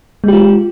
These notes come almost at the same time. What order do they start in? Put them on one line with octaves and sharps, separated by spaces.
G#3 G4 F4